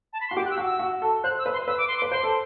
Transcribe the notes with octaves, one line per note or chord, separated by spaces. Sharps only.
A5
B5
C6
F#4
G4 D6
F#6
E6
F#4
E6
F#4
A4
C5 F#6
E6
B4
C6
B4 E6
D6
C6
D6
B4
C5 C6
A4